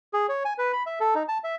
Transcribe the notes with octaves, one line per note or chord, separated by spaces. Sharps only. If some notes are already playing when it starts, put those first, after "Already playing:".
G#4
C#5
G#5
B4
B5
E5
A4
D#4
A5
E5